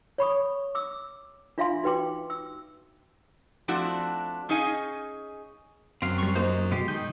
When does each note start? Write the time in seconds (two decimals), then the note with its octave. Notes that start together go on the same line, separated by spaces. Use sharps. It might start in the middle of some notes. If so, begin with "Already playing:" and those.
0.18 C#5 B5 C#6 D#6
0.75 D6 E6
1.58 D4 F4 E5 F5 G#5 C6
1.83 D#4 F#4 B4 G5 C6 D6
2.30 E6
3.68 F3 A3 C4 D4 E4 F#4
4.49 C#4 D#4 G#4 D#5 F5 G#5
6.02 F#2 C4 F5
6.18 G3 C#6
6.36 A#3 D#4 C5
6.72 B2 G#3 G4 C7
6.88 D#3 G6